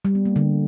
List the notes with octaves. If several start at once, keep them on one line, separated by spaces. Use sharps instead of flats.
G3
B3
A#3
D3